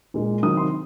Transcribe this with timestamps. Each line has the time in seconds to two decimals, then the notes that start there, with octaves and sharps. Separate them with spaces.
0.14 A#2 G#3
0.43 C3 D#3 F#3 D#6
0.57 C6